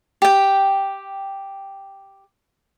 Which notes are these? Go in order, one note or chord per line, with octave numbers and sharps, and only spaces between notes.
G4 G5